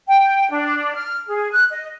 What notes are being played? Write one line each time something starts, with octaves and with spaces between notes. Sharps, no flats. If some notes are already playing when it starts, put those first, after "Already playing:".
G5
D4
F6
G#4
F#6
D#5